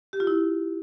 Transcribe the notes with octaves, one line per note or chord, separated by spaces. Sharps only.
G4
F4
E4